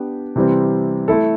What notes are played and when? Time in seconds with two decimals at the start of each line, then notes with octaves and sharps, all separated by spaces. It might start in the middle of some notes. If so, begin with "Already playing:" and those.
Already playing: B3 D4 G4
0.36 C3 E3 G3 C4
1.08 A3 E4 A4